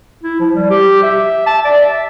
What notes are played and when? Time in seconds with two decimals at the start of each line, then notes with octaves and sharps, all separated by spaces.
0.24 E4
0.40 F3
0.55 G3
0.70 G4
1.03 E5
1.46 A5
1.65 D5
1.80 E5